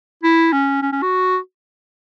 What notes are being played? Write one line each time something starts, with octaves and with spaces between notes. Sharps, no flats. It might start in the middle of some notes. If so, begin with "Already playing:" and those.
E4
C#4
C#4
C#4
F#4